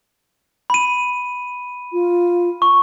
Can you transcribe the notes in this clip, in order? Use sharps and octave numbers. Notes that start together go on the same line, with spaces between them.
B5 D#7
F4
C#6